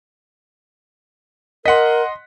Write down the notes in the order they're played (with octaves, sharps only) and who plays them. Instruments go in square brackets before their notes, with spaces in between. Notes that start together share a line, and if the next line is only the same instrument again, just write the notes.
[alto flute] A#4 [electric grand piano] D#5 C6 [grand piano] F#5 B6